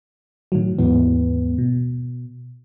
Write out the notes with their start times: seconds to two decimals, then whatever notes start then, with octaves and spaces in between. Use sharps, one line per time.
0.52 A2 D#3 F#3
0.79 D#2 G#2 E3 B3
1.58 B2